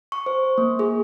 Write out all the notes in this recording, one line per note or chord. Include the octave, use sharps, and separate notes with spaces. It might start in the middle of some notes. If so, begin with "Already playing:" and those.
C#6
C5
A#3
G#4